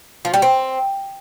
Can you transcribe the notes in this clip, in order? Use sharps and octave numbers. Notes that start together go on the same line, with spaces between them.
F3
G3
C4